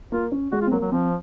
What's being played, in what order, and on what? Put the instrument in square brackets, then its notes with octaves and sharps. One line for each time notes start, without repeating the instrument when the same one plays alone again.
[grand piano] A#3 [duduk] F4
[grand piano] C#4
[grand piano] G#3 [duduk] F#4
[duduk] F4
[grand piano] C4
[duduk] F#3 [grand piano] A#3
[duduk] F#3
[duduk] F3 [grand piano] C4